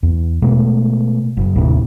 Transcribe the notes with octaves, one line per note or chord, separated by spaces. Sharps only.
E2
B2 G#3 A3
F#1
D#2 A2 C3